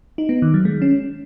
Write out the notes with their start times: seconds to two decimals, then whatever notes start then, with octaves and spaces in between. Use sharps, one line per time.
0.18 D#4
0.29 B3
0.42 D#3
0.54 F#3
0.65 G#3
0.82 C#4